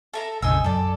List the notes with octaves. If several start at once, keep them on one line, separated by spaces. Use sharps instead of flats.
A4 E5 A#5
A#1 F2 C#3 D#4 G#5 E6
F#2 A4 D5